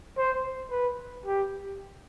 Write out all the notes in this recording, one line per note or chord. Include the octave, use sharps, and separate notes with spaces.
C5
B4
G4